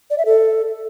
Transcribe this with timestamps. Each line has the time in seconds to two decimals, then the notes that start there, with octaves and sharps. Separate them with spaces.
0.10 D5
0.18 E5
0.26 A4